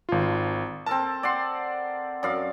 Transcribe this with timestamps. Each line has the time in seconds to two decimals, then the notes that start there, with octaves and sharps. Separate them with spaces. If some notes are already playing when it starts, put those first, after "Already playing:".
0.09 G#1 F4
0.86 C4 A4 A#4 A5
1.23 D5 F#5 C6
2.23 F#2 D5 F5